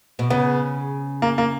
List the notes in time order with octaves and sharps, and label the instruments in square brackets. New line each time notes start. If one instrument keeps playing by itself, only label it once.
[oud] B2
[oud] C#3 [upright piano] B3
[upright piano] A#3
A#3